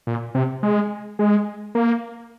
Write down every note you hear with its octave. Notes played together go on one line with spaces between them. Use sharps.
A#2
C3
G#3
G#3
A#3